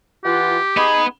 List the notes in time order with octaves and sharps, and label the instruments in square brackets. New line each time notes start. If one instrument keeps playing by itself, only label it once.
[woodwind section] E3 F4 F#5 [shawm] G4
[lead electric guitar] B3 B5 [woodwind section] D#4 G#4